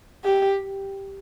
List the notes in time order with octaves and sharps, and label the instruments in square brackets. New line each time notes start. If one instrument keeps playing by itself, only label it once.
[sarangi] G4